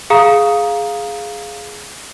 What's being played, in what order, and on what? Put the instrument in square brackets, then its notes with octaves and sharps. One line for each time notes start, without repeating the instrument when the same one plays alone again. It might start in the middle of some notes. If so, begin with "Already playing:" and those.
[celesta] G#4 F5 A#5 D#6